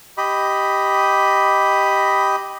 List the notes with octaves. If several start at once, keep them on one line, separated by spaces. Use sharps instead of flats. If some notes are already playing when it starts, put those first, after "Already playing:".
G4 D#5 B5